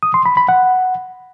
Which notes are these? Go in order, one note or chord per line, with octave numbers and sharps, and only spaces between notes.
D#6
C6
B5
B5
F#5